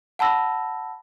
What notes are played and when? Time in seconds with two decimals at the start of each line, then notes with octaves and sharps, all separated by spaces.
0.19 F#5 A5 B5 E6 A#6